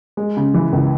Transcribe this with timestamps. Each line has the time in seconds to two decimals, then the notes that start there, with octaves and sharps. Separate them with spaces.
0.17 G#3
0.37 C#3
0.54 E3
0.73 C#2